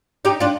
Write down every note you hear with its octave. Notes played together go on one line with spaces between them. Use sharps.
D#4 G4
D4 F4